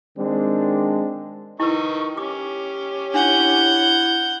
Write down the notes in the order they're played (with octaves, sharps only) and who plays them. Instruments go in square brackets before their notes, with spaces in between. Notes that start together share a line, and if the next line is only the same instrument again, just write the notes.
[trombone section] D#3 G#3 C4 D4
[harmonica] D#3 D#4 C#6 [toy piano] E4 B4
[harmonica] C#4 G4 [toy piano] D6
[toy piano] D4 [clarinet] E4 [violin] F#5 G6